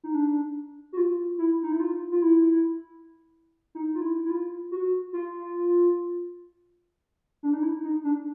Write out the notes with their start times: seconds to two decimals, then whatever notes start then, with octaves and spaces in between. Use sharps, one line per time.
0.04 D#4
0.14 D4
0.93 F#4
0.97 F4
1.38 E4
1.63 D#4
1.72 E4
1.80 F4
2.11 F4
2.22 E4
3.75 D#4
3.95 F4
4.02 E4
4.25 E4
4.30 F4
4.71 F#4
5.13 F4
7.43 D4
7.53 D#4
7.63 E4
7.84 D#4
8.04 D4